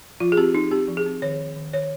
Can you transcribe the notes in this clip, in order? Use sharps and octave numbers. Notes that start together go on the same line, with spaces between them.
F3 F4
G#4
C4 G4
C4 D#4
C4 G4
F3
G#4
C4
D#3 C#5
D#3
D#3
D#3 C#5